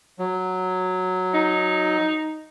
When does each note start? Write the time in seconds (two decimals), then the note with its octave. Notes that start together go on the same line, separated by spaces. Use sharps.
0.19 F#3
1.34 D#4